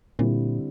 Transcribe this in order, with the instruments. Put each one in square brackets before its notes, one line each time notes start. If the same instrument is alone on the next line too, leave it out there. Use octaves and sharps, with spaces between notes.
[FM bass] A#2 [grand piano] D3 G3 C4 E4